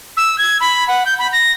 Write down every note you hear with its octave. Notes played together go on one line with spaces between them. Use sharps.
E6
G#6
B5
F#5
G6
B5
A#6